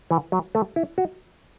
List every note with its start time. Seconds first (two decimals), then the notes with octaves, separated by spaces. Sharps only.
0.11 E3
0.32 F#3
0.55 A3
0.76 E4
0.98 F#4